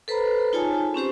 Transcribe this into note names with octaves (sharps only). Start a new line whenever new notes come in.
A4 B4 C5 A#5 B5
D#4 F4 G#4 C#5 G#5 A5
C4 C#4 G4 C5